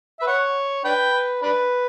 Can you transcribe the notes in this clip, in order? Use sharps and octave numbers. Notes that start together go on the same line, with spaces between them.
E5
B4
C#5 F#5
D4 B4 G5
B4
D4 B4